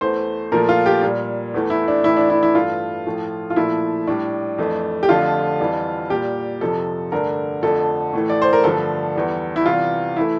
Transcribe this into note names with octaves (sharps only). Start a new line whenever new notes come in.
E2 E3 A3 C5
A#2 F3 A3 A#4
F4
G4
A#2 G3
E2 E3 A3
E4
D4
A2 E3 A3 E4
D4
E4
E4
G2 E3 A3 F4
A2 F3 A3
F4
A#2 F3 A3 E4
A2 G3 D4
F2 E3 A3
G4
F2 D3 F3 A3 F4
F2 E3 G3
A#2 G3 G4
F2 C3 F3 A4
G2 D3 A3 A#4
F2 D3 F3 A3 A4
A2 E3 A3
D5
C5
A#4
G2 D3 F3 A3 A4
E2 E3 G3
E4
E2 C3 E3 G3 F4
E3 A3 E4